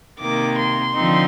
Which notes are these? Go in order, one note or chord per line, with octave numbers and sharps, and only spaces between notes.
C3 D#3 A#3 D6
C6
D3 F3 C4 D#4